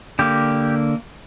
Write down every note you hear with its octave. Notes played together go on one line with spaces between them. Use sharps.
D3 A#3 G4